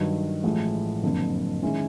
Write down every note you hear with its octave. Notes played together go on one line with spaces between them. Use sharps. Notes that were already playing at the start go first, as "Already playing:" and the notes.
Already playing: G2 D#3 F#3
A1 A2 F3 G#3
F#1 F2 D3
D#3 G#3 C#4 E4